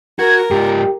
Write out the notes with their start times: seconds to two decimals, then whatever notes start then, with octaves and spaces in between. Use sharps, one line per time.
0.19 F#4 A#4 G#6
0.51 G#2 F4 G4